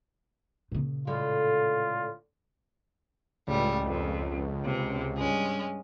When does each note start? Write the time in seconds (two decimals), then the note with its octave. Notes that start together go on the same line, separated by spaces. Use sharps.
0.72 A#2 C#3
1.07 A2 D3 G#3 F4
3.47 C#2 A2 G3
3.85 F2
4.63 C3
5.17 G2 G#3 C#4